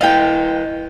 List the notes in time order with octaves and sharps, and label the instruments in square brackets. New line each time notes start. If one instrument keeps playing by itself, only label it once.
[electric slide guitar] E4 B4 D#5 [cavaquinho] F5 G5